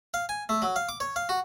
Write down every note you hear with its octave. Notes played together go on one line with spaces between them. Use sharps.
F5
G#5
A3
F#3
F5
D6
C#5
F5
F#4